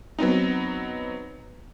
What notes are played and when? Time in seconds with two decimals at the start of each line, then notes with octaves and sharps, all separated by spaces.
0.19 F#3 B3 C4 D#4